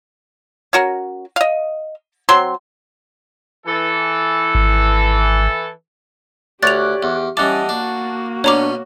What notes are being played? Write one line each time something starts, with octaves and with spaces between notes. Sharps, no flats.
C#4 F#4 A#4
D#5 F5
F#3 C4 C6
E3 A4
G#1
D2 G4 C#5 D5 F#6 A6 F7
E2
E3 G3 C#4 D#5 F#5 A5 D6
A#3 D4 F#4
B2 C#4 D4 C#5 A#5 D6